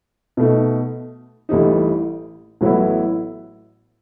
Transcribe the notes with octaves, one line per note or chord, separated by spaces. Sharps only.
B2 A3 D#4
A1 A2 E3 G3 D#4
A1 A2 F#3 B3 E4